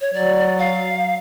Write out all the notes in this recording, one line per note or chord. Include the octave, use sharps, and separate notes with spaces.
C#5
F#3 D5
F5